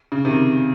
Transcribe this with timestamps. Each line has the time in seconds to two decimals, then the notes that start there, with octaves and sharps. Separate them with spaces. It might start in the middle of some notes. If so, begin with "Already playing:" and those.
0.12 C#3
0.25 C3 D#3